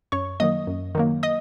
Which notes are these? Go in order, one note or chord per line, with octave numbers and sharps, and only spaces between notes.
F#2 C#5 C#6
D#3 F#3 A#3 D#5 D#6
F#2
D#3 F#3 A#3
D#5 D#6